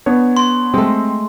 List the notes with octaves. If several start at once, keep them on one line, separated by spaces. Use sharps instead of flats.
B3 D4 C#5
C6
G#3 A3 C4